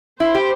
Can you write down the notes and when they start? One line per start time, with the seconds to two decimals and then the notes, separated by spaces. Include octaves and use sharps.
0.20 E4 C5
0.35 G4